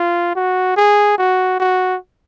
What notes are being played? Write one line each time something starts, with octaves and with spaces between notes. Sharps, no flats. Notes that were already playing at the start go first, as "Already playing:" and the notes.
Already playing: F4
F#4
G#4
F#4
F#4